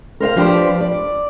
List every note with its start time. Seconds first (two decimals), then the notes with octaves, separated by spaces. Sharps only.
0.20 A#4 C5 E5 F5
0.36 F3 D4 G4 B4 C5 D5
0.81 D5